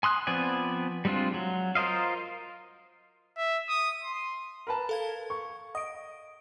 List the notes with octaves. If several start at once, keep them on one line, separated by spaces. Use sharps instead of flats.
G#5 C6 D#6 F#6
F3 B3 C4 D5 G#5
G3 G#3 C4 D4 F4
F#3
F4 A#4 C5 D#5 F5
E5
D#6
C6
A#4 B4 A5
A4 F5 G#6
C#6
D#5 D#6 D7